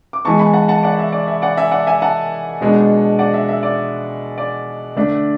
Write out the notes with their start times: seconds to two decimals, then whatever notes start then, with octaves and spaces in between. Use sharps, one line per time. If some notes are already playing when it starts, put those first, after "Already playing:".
0.13 D6
0.25 E3 G#3 B3 A5 C#6
0.39 G#5 B5
0.54 F#5 A5
0.68 F#5 A5
0.83 D5 F#5
0.99 E5
1.12 D5
1.27 E5
1.42 D5 F#5
1.57 E5 G#5
1.71 D5 F#5
1.87 E5 G#5
2.02 F#5 A5
2.61 B2 G#3 B3 D4
3.19 D5 F#5
3.34 E5
3.49 E5
3.63 D5
4.38 D5
4.96 D3 A3 D4